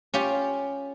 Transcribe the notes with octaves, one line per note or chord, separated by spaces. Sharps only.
C#4 F4 G4